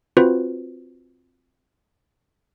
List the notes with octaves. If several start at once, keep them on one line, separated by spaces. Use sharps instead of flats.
C4 F4 F#4 B4 C5